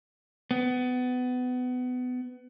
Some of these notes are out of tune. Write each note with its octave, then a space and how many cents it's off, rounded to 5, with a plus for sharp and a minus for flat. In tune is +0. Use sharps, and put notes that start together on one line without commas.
B3 +25